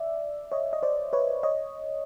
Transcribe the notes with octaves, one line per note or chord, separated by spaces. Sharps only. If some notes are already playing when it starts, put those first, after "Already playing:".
Already playing: D5 E5
C#5 D#5
D#5
C5 D5
B4 C#5
C#5 D#5